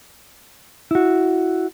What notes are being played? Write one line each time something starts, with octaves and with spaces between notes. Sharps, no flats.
E4 F#4